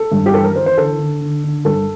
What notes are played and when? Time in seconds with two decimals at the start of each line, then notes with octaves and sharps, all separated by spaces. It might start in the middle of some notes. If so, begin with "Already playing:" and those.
Already playing: A4
0.12 G2
0.26 G4
0.33 E3 A4
0.44 A#4
0.56 E3 C5
0.66 C5
0.77 D3 A4
0.99 D3
1.21 D3
1.44 D3
1.65 G2 A4